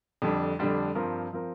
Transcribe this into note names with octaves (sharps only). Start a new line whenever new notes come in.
F2 D3 G3 D4
F2 D3 G3 D4
G2 F3 C4 A#4
F3 C4 A#4